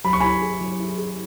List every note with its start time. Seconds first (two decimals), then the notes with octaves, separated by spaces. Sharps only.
0.05 F#3 B5
0.13 C#6
0.20 E4 G#5 B5
0.42 G#4
0.61 F#3
0.80 E4
0.98 G#4